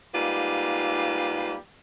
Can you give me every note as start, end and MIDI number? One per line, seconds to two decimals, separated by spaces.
0.15 1.56 44
0.15 1.56 55
0.15 1.56 58
0.15 1.56 65
0.15 1.56 71